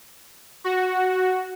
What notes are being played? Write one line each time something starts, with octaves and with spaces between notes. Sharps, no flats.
F#4